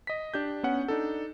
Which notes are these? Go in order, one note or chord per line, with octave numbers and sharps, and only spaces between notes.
D#5 B6
D4 G4 G6
B3 C#4 F#5
D4 D#4 A4